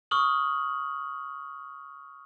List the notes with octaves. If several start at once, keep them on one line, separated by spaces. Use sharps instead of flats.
C#6 D#6 F6 F#7